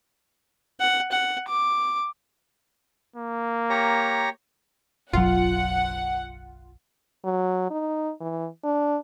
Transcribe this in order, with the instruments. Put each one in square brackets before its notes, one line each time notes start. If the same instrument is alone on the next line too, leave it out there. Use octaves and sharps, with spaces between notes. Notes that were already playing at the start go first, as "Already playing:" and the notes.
[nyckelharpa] F#5
F#5
D6
[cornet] A#3
[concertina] G4 C#5 A#5
[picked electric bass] F#1 B1 F#3 [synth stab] F4 [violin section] F#5
[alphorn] F#3
D#4
E3
D4